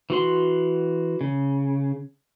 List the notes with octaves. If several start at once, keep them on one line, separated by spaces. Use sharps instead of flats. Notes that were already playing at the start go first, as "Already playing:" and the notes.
E3 F#4 C6
C#3